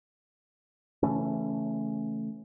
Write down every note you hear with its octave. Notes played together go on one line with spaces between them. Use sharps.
C#3 E3 A3 C#4